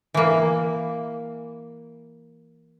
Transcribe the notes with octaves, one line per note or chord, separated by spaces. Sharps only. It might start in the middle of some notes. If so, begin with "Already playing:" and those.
E3 A#3